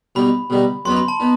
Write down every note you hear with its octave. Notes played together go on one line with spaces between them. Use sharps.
B2 G3 D#4 B5
B2 G3 D#4
F#2 F#3 B3 D#4 C6
B5
A5
B3 D#4